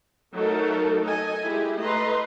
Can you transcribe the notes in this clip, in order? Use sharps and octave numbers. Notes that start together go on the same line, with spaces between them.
F#3 A3 D#4 A4 A#4
A4 D#5 G#5
G#3 E4 G4
A3 B4 D#5 A#5 C6